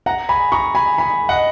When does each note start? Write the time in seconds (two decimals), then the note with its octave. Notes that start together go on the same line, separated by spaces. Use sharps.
0.06 F#5 A#5
0.29 G#5 B5
0.52 A#5 C#6
0.75 G#5 B5
0.98 G#5 B5
1.29 D#5 F#5